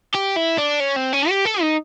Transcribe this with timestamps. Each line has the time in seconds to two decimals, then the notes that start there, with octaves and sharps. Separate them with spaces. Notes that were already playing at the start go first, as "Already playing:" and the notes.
0.15 G4
0.37 E4
0.58 D4
0.80 C#4
0.96 C4
1.13 C#4
1.29 G4
1.45 A4
1.61 D#4